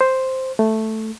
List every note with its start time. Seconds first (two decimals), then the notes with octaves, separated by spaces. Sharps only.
0.01 C5
0.59 A3